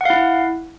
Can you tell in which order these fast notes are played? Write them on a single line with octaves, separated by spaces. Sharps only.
F#5 F5 E4